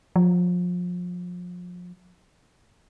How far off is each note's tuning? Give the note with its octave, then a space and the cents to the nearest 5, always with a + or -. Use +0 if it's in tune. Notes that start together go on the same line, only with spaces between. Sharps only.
F3 +30